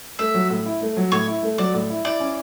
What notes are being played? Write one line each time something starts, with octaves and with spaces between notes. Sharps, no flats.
A3 E5
F#3
A2
E4
A3
F#3
A2 C#5
E4
A3
F#3 D5
A2
E4
E4 D5
C#4